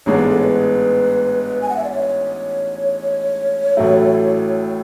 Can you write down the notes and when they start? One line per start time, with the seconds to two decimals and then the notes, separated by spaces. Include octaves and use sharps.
0.06 A1 G#2 G#3 B3 D4 C#5
0.17 B4
0.29 A4
0.40 C#5
0.43 B4
1.61 G#5
1.69 F#5
1.77 E5
1.84 D5
1.91 C#5
3.77 A1 A2 F#3 A3 E4